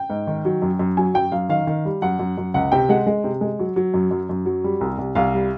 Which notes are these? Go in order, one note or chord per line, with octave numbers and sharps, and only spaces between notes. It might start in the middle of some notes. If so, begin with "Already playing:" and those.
Already playing: G5
G#2
D#3
F#3
F#2
F#2
F#3 G#5
F#2 G5
F#2 F5
D#3 F5
D#3
G3
F#2 F#5
F#2
F#2
C#2 F#5
C3 G5
G#3 F#5
G#3
C3
G#3
F#3
F#3
F#2
F#2
F#2
F#3
G3
C2
C2
C2 F5
G3